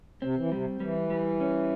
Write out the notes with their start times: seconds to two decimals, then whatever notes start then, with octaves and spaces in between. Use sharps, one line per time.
0.22 C3 C4
0.37 E3
0.52 C3 G3
0.80 E3 G3
1.10 G3
1.40 C#4